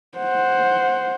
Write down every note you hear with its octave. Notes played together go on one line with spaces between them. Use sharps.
C5 F#5